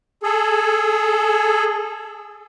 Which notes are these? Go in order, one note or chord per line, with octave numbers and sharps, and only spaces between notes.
G#4 A4